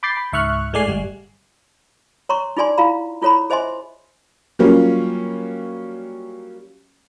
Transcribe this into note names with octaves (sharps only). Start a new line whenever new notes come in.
B5 D6 G6 A6 C7
B5
C#2 G#2 E5 C#6 F6 F#6
A2 G#3 A3 D5 G#5 C7
G1 G3
C#5 A#5 C6 C#6
D#4 F4 G#4 D5 G#5 C6
E4 F4 F5 A#5 B5
E4 F4 A4 C#5 A#5 B5
G#4 C5 D#5 E5 G#5 C6
F#3 G3 A#3 C#4 F4